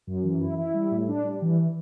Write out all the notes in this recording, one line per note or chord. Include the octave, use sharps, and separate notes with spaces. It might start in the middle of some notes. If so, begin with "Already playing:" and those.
F#2
E3
E4
E4
G3
A2
D4
G3
E3